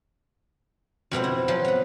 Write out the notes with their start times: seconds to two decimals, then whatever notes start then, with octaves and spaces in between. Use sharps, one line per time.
1.11 F2 B2 B3 C4
1.24 E4
1.48 F3 F#3
1.65 B3 B4